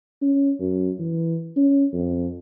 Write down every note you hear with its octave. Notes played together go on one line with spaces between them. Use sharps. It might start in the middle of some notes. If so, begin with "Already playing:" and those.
C#4
F#2
E3
C#4
F2